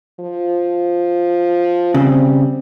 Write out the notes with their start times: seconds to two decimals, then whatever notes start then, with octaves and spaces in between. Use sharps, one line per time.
0.20 F3
1.94 C#3 G3 C4